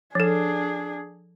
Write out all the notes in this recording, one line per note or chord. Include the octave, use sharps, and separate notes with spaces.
F3 D4 G#4 A4